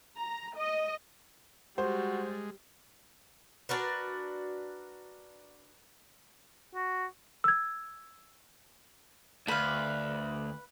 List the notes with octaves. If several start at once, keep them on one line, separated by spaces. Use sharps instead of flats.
A#5
D#5
G3 G#3 F#4 C5
D4 F#4 A#4 B4
F#4
E6 G#6
D2 B4 F5